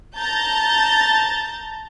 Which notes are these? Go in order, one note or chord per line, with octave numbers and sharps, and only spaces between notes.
A5 A#5 G6 A6